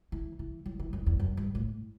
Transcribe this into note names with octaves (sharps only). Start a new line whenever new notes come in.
E3
E3
F#3
E3
F#2
E2
F#2
G2
A2